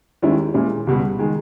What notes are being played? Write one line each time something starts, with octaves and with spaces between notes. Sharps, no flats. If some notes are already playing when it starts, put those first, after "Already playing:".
D#2 D#3 G#3 C#4 E4
A#2 G#3 C#4 E4
C#2 B2 G3
D#3 G#3